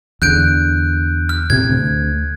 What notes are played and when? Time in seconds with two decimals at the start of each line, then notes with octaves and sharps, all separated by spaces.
0.22 E2 D3 F#6 G6 D7
1.29 F6
1.50 A2 C3 C4 G#6
1.69 D2